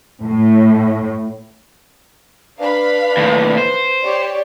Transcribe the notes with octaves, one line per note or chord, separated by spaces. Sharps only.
A2
D4 B4 F5 B5
D#2 A2
C5
G4 C#5 D5